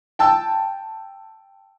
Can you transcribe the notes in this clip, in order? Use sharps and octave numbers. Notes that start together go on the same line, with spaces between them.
G5 A5 E6